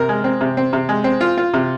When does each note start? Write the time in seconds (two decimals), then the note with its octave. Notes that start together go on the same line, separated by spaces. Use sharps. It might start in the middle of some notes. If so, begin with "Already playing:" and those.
Already playing: C3 A#4
0.09 G#3
0.24 C4
0.41 C3
0.57 C4
0.73 C3
0.89 G#3
1.04 C4
1.21 F4
1.38 F4
1.54 C3